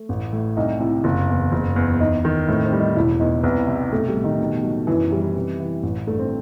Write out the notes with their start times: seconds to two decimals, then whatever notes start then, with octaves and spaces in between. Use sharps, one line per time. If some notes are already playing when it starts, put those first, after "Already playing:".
Already playing: A3
0.09 A1
0.33 A2
0.57 C2 D#4
0.80 C3 E4
1.04 F#1
1.29 E2
1.52 F#1
1.76 E2
2.00 E2 D#4
2.25 D#3
2.48 A2 C4
2.65 C4
2.72 G3
2.80 D#4
2.96 E1 E4
3.20 E2 D#4
3.43 C2 B3
3.68 C3
3.92 B1 A3
4.08 G3
4.16 A2
4.24 D#3
4.40 B2
4.63 F#3
4.87 F#2 E3
5.12 E3 G3
5.36 C3
5.60 E3
5.83 A1
6.07 G2 A3
6.19 C4